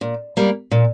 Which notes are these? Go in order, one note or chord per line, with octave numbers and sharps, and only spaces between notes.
A#2
G3 A#3
A#2